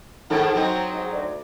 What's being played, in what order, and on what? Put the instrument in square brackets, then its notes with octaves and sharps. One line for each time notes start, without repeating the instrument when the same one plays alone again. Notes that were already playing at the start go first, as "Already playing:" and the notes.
[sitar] G#2 D#3 A4 [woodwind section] F#5
[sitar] F#3 C4 D#4
[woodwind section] G#2
D2 D5